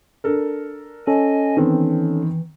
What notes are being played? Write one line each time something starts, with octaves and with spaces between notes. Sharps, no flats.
D4 A4 A#4
C#4 A4 D#5 G#5
D#3 E3 B3 C4